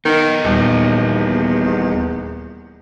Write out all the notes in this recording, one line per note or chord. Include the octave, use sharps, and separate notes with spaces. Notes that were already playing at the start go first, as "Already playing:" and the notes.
D#3 B3 D#4
D#1 E2